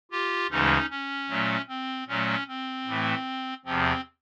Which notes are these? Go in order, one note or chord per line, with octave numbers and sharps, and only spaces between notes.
F4 G4
D2 C#3 E3 G#3 C#4 D#4
C#4
A#2 F#3 A3
C4
A#2 F#3 A3 C#4
C4
A2 E3 A3
E2 C3 F3 C4